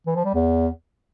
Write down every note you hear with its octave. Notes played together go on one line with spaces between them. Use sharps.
E3
F3
G3
E2